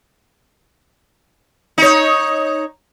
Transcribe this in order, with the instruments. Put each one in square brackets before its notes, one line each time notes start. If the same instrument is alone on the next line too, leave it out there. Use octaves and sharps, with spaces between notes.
[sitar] D#4 C#5